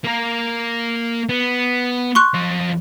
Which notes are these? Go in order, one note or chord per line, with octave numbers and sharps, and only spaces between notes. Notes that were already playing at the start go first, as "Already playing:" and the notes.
A#3 A#4
B3
C6 C#6 F#6
F2 D#5